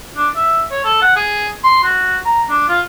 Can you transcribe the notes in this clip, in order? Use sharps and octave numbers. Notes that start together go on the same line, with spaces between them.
D4
E5
C#5
A4
F#5
G#4
C6
F#4
A#5
D4
F4